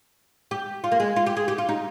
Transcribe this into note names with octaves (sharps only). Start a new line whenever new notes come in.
G4
F4
A#3
G#3
F4
G4
G#4
G4
F4
D#4